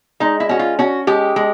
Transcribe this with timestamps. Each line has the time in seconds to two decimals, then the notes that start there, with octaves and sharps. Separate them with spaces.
0.20 G#3 D#4
0.40 E4
0.49 C#4 F#4
0.59 F4
0.79 C#4 F#4
1.07 G#3 G4
1.36 G#3